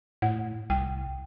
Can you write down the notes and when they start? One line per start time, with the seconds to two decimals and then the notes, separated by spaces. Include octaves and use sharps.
0.22 A2 F#5
0.70 C2 G5